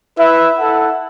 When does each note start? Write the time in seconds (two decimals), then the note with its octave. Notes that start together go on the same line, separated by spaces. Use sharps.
0.18 E4 B4 E5
0.58 E4 A4 F#5